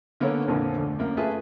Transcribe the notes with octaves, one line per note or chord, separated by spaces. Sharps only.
D3 A#3 B3 C#4 A4 C#5
A#1 F2 A#2 D3 F3
D2
F#2 A#3
A3 F4 G#4 B4 E5 A5